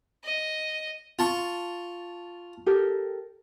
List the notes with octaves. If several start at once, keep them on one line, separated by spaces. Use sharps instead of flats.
D#5
F4 A5 C#6
G4 A4 A#4